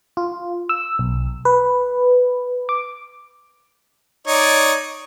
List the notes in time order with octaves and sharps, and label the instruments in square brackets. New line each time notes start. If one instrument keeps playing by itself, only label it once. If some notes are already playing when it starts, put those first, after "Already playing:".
[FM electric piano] F4
E6
B1
B4
D6
[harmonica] D#4 C#5 D5